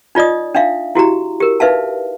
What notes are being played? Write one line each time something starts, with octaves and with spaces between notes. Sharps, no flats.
D#4 F4 D5 D#5 D#6
D4 D#4 E5 F5
E4 F#4 G4 A#5
G4 A#4
D#4 B4 E5 F5 A5